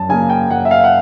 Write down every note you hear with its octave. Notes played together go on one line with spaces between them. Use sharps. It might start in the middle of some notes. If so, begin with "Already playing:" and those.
Already playing: F#2 A5
C#3 F#3 A#3 G#5
G5
F#2 F#5
E5
F5
F#5